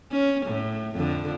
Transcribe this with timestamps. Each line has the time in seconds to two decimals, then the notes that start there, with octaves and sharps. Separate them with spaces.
0.11 C#4
0.46 A2
0.96 F2 D3